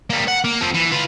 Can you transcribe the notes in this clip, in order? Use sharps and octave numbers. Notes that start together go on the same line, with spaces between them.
G3 A#3
F#5
A#3
F3 C4
E3
F4 B4